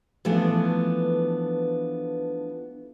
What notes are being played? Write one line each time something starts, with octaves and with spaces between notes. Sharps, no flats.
E3 F3 A3 B3 D4